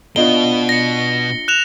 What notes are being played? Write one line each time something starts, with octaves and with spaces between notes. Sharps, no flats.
B2 D4 F4 D#5 G7
A#6 C#7
F#6 E7 F7